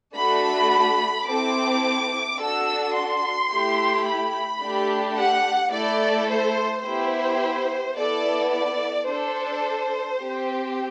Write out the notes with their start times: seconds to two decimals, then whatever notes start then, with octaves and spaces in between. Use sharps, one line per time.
0.15 A3 D4 F#4 A4 B5
1.26 C4 E4 A4 D6
2.38 D4 F#4 A4 E6
2.94 C6
3.50 A3 E4 G4
4.06 B5
4.61 A3 D4 G4
5.17 F#5
5.72 A3 E4 A4 D5
6.29 C5
6.84 B3 E4 G4 C5
7.95 B3 E4 A4 D5
8.52 D5
9.07 D4 A4 C5
10.19 C4 G4